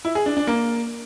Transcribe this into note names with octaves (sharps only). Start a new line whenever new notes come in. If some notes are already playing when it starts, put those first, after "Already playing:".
E4
G#4
D4
D4
A#3